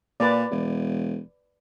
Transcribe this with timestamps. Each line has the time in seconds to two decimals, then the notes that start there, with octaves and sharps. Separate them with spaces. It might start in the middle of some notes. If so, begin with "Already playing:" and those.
0.20 A#2 B4 D5
0.51 E1